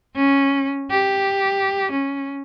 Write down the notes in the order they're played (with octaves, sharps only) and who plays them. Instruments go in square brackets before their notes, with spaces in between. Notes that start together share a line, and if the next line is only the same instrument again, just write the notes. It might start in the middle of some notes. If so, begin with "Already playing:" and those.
[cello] C#4
G4
C#4